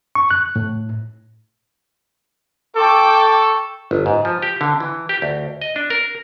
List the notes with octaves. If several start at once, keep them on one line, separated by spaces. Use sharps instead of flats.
C#6
F#6
A2
A4 G5 C#6 D6
G1
G#2
F3
G4
D3
E3
G4
D2
D#5
D4
A#4